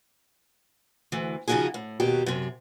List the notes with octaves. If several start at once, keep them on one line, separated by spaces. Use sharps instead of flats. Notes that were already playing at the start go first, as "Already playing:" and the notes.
D2 E3
C#3 F3 G#3 D#4 F#4 G#4
A2
D#2 B2 F#3 G4
F#2 C3